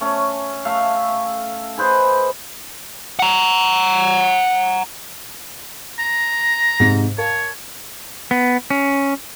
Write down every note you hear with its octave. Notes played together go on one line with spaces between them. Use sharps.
A3 C#4
A3 E5 F5
G#4 B4 C5 D#5
F#5 A#5
A#5
G#2 C3
A#4 C#5 F5 A5
B3
C#4